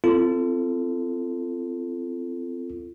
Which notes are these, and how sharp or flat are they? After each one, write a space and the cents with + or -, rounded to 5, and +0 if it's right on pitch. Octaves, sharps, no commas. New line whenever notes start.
C4 -10 F4 -35 A4 +5